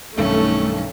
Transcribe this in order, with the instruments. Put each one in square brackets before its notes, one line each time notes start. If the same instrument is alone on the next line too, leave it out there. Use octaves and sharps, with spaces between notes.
[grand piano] B1 G2 D#3 [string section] A3 [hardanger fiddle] C#4